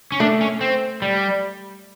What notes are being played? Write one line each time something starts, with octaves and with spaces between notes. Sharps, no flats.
C#4
A3 D4
C#4
C4
G3